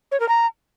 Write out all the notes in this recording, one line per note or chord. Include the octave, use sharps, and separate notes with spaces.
C#5
A#4
A#5